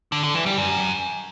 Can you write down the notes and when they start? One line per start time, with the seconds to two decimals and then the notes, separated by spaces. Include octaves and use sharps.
0.12 D3
0.23 D3
0.35 E3
0.46 G3
0.58 F#2